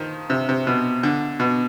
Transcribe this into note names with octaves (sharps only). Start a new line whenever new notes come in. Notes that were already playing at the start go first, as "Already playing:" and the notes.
Already playing: D#3 F3
C3
C3
B2
D3
B2